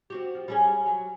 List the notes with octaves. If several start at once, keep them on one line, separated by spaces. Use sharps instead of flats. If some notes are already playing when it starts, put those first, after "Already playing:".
C4 F#4 G4
F3
G3 C#4 G#4
F#3